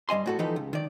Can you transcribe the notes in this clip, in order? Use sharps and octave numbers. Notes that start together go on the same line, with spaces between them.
G2 G3 D#5 G#5 C6
A2 F#4 A4
E3 F3 D#4 G4 A4 B4
C#2
D#3 D5